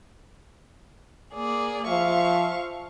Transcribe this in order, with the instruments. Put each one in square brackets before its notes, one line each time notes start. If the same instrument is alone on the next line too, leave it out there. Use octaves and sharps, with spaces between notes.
[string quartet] A#3 G#4 D5
[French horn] F3 [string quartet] E5 F5 C#6